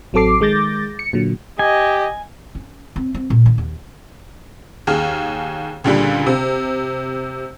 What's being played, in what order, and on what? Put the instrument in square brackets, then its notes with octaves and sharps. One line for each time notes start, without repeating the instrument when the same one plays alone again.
[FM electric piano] A1 F#3 C4 A4 D6 C7
D#3 G#3 D6 G6 A6 A#6
C#7
A#2 D3 F#3
[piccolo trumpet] G4 [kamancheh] D#5 [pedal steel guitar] G#5
[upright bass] C#4
C4
C4
A#2
D#3
D#2
[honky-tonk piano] D#2 G#4 F6
C#2 A#2 D3 G3
C3